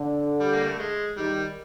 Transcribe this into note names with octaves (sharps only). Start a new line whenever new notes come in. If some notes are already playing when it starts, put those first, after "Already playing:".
Already playing: D3
G3
A#3
A3
G#3
D#3 G3